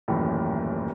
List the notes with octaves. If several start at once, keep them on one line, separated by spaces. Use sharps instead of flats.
D#1 A1 F#2 A2